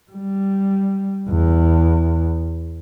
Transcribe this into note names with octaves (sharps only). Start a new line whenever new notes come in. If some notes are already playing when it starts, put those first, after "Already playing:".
G3
E2